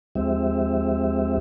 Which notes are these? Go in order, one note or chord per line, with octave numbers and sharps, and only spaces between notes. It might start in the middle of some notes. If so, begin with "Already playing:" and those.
D#2 F3 G#3 C4 G4 E5